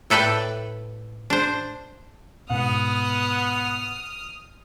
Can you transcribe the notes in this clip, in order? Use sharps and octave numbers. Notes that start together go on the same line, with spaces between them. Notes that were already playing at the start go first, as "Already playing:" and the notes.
A2 A4 B4 D5 G5
D4 C5
G#2 B2 B3 F#5 D#6 F6